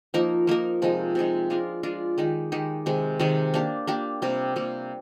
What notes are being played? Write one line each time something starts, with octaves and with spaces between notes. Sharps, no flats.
F3 A#3 D#4 A#4
F3 A#3 D#4 A#4
C3 F3 G#3 D#4
C3 F3 G#3 D#4
G#3 D4 F4 A#4
G#3 D4 F4 A#4
D#3 G#3 D#4 G4
D#3 G#3 D#4 G4
C3 D#3 G#3
C3 D#3 G#3
A#3 D4 G4
A#3 D4 G4
C3 G3 A#3
C3 G3 A#3